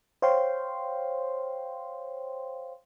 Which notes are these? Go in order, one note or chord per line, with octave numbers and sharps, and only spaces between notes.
C5 C#5 F5 G5 C6